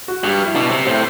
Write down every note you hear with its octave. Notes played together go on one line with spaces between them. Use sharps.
F#4
G2 G4
E4
B2 D4
C3 C4
A2 C4